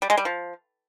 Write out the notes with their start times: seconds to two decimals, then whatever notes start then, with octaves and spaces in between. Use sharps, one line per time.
0.02 G3
0.10 G#3
0.17 G3
0.25 F3